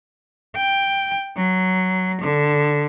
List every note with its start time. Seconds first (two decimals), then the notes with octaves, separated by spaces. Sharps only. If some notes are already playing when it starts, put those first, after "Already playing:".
0.56 G5
1.37 F#3
2.21 D3